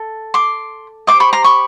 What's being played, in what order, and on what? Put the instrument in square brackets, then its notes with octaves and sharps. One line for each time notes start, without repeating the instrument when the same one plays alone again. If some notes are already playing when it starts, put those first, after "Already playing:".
Already playing: [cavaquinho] A4
C6 D6
G4 C5 D#5 C6 D6
B5 C#6
A#5 C6
B5 C#6